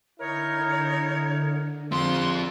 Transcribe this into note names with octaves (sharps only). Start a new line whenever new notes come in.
D3 D#4 E4 A#4 C#5
A#1 F3 C4 C6